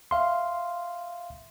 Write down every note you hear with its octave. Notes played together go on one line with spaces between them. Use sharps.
E5 F5 C6